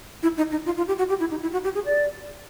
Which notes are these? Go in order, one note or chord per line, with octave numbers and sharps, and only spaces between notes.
E4
D#4
D#4
F4
F4
G4
F#4
G4
E4
D#4
E4
F#4
G4
G#4
D5